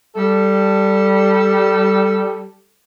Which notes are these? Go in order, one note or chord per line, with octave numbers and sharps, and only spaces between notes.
G3 A4